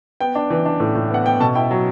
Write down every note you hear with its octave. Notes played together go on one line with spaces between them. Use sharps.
B3 G5
D4
E3
D4
A2
A2
B3 F#5
B3 G5
B2 A4 A5
E4 G5
F#3